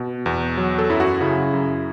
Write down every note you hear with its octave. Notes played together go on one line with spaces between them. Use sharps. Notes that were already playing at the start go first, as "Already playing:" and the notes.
Already playing: B2
E2
F#3
A4
F#2 E4
F#4
C#3 E4
F#2